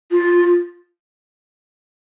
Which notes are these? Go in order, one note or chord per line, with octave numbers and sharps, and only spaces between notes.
F4